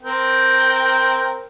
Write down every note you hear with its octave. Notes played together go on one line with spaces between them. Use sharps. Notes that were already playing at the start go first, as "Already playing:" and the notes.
C4 A#4 G5